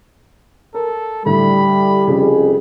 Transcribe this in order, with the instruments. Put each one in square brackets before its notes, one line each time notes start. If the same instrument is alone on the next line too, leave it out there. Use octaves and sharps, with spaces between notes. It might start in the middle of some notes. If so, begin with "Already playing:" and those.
[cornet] A4 [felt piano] A#4
[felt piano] A2 D3 [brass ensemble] G3 [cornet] B5
[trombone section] C2 F2 G#4 [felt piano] C#3